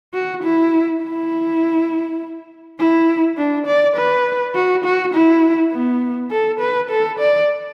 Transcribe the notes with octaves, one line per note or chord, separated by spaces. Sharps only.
F#4
E4
E4
E4
D4
D5
B4
F#4
F#4
E4
B3
A4
B4
A4
D5